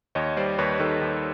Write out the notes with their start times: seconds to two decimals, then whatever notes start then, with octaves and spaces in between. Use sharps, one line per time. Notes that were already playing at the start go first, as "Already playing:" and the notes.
0.15 D#2 C#5 D#5
0.37 G3 C5 D5
0.58 D#2 B4 C#5
0.80 D#3 A4 B4
1.01 D#2